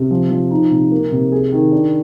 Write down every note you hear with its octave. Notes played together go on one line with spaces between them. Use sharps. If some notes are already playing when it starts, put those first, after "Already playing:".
Already playing: C3
F3
F3
D#4
C3
A#3
C3
G#4
D#3
D4